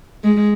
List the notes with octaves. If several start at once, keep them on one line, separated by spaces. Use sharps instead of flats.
G#3